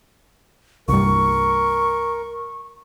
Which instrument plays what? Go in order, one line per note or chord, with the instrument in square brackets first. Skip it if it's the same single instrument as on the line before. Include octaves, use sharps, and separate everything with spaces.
[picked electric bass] C2 G2 [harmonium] A#4 [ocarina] C#6